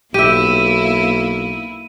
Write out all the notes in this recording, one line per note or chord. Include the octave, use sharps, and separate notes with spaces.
B1 A#3 E4 G4 E5 D#7